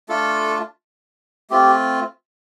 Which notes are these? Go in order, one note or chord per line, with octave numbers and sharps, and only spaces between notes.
A3 D4 F4 A4
A3 C4 F4 G4